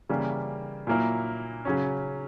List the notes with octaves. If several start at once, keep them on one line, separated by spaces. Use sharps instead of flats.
C#3 E3 G3 A#3
A#2 F#3 A#3 E4 A#4
C#3 F#3 C#4